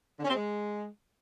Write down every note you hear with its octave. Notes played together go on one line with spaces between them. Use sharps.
D3
C#4
C4
G#3